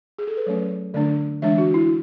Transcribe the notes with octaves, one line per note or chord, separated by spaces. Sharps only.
G#4
A4
B4
F#3 A3 C#4 C#5
D3 A3 D4 D5
E3 G#3 D4 E5
F#4
E4